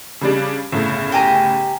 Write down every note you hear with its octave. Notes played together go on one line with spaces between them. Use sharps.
C#3 G3 D4
G1 A2 C#3
G4 G#5 A#5